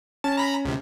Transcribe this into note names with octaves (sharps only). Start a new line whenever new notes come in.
C#4 A5
A#5 B5
C#2 C3